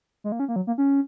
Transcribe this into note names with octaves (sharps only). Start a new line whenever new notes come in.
G#3
A#3
C#4
A#3
F#3
A#3
C#4